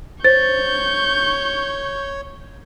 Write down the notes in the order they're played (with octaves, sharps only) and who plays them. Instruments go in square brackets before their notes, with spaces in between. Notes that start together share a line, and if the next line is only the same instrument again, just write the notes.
[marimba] C5 [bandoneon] C#5 [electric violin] C#6 G6 [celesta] A6